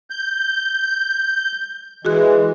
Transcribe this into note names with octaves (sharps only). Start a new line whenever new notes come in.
G6
E3 G#3 F#4 G#4 F#6